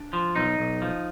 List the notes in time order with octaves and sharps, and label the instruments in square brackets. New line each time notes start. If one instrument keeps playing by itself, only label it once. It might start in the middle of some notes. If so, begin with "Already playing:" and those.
Already playing: [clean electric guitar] D4
F3
B1 D#4
B1
F3